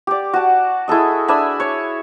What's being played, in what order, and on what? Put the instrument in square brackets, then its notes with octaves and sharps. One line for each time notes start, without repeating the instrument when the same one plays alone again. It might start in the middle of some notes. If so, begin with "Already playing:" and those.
[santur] G4 D5
F#4 A5
E4 G#4 A4 D#5
D4 E5 G#5 B5
C#5